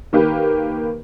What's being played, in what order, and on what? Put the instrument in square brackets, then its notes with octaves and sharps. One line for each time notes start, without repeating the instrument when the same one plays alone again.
[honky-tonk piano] D#3 A#3 G4 B4